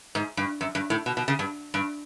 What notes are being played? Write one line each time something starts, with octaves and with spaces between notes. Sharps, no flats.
G#2
G2
F#2
G2
A2
B2
B2
C#3
G2
G2